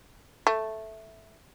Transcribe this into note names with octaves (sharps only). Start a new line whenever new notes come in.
A3